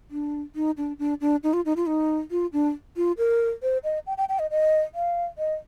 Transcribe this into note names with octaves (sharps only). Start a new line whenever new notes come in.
D4
D#4
D4
D4
D4
D#4
F4
D#4
F4
D#4
F4
D4
F4
A#4
C5
D#5
G5
G5
G5
D#5
D#5
F5
D#5